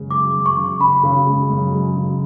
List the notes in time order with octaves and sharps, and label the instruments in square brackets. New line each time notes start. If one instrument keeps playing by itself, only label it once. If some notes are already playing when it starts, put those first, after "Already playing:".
Already playing: [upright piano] F#2 C#3 G#3
[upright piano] G#3 [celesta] D6
[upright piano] F#2
[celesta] C#6
[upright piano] C#3
[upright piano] C#3 [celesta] B5
[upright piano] C#3
G#3
F#2
G#3
C#3